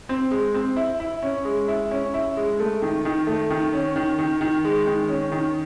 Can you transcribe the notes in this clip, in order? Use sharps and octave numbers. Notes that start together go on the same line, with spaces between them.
C4
G#3
C4
E4
E4
C#4
G#3
E4
C#4
E4
G#3
A3
D#3
D#3
A3
D#3
C#4
D#3
D#3
D#3
G#3
D#3
C#4
D#3